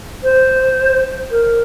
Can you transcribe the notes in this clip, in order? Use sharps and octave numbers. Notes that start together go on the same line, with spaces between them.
C5
A#4